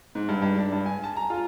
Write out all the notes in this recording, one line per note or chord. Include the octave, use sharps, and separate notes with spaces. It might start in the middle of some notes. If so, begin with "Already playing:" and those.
G#2
G2
G2
D4
G2
G#5
A5
A#5
F4